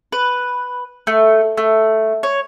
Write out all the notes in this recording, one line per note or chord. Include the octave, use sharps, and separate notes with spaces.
B4
A3
A3
C#5